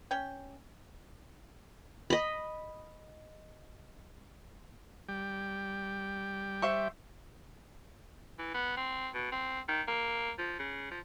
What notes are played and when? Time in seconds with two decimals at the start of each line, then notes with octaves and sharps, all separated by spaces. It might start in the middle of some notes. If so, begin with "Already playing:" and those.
0.11 C#4 G5
2.10 D#5 B5
5.09 G3 G5
6.62 C5 E5 C#6
8.39 E3
8.54 B3
8.77 C4
9.14 B2
9.32 C4
9.68 D#3
9.87 A#3
10.39 F3
10.59 C#3
10.91 F3